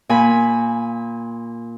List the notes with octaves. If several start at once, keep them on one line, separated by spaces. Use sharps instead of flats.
A#2 G#5 B5